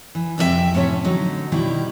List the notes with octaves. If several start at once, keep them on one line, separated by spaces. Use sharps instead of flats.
E3
F2 C3 C#4 E5 G5
F2 A2 C3 C#4 C#5 A5
D3 F#3 D#4
B2 D#3 G3 E4 G4